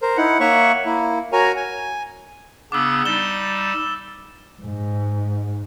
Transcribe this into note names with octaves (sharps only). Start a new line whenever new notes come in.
A#4 C5
D#4 E4 F#5
A#3 C#5 E5 F#5 C#6
A#3 E4
F#4 A#4 C#5 G#5 A#5
G#5
C#3 B3 D4 D6 E6
G3 D#4 A6 E7 G7
G#2